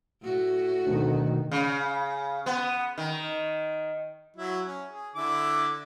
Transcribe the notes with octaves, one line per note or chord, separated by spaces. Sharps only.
A2 F#4
F#1 D2 B2 D#3
C#3
B3
D#3
F#3 E4
C#4
G#4
D3 E4 D6